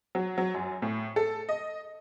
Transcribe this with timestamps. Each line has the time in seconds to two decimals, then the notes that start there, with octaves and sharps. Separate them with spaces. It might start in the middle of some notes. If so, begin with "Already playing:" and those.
0.15 F#3
0.38 F#3
0.54 F#2
0.82 A2
1.16 A4
1.49 D#5